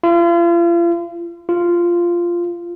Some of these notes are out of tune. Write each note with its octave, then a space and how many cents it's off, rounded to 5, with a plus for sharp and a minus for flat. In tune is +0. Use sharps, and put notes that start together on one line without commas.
F4 -40
F4 -10